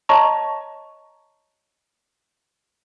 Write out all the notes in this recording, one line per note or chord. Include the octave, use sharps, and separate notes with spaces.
C#5 D#5 A5 A#5 C#6